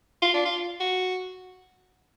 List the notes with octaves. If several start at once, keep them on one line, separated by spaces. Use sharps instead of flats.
F4
D4
F4
F#4